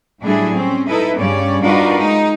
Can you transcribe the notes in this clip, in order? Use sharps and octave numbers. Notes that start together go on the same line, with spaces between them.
A2 F#3 G3 D4 E4 G#4
C4 C#4
D#4 E4 A4 B4 D#5 E5
G2 C#3 G3 C#4 C#5 D5
D4 D#4 F4 F#4 A#4 B4
G#3 D#4